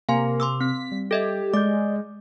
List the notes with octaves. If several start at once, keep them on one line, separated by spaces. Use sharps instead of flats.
C3 A#3 F5 G#5 C6
C6 D6 E6
C4 B6
G3
G4 A4 D#5 E5
G#3 D5 D#5 D6 G6